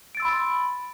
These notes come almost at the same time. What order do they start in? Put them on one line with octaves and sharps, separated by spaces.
D7 A6 E6 C6 B5